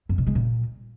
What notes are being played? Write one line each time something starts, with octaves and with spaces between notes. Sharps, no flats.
F#2
B2
G#3
A#2